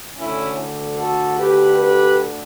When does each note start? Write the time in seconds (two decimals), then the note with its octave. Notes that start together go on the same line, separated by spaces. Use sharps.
0.17 D2 D3 C#4 E4
0.98 F#4 A4
1.38 G4 B4
1.79 G4 B4